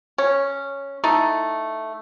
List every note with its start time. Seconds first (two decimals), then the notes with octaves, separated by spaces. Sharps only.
0.18 C#4
1.04 A3 D#4 E4